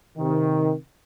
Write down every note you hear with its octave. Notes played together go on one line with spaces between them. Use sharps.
C3 D#3